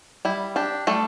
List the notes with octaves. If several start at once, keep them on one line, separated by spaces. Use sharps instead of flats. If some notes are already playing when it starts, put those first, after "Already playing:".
G3 E4
D4 G4
G3 A3 A4